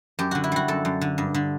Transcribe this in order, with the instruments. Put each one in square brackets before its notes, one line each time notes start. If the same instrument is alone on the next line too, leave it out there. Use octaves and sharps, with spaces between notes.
[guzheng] F#2 G4
D3 F#4
E4
G3 F#4
F#2 A4
F#2
D3
G2
D3